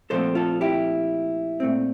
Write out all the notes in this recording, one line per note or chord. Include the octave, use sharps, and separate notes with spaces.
A#2 F3 A3 C4 A4 C5
F4 A4
E4 G4
A#2 A3 C4